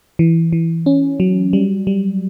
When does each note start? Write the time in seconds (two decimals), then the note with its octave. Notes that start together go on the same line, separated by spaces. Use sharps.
0.19 E3
0.53 E3
0.86 C#4
1.20 F#3
1.53 G3
1.87 G3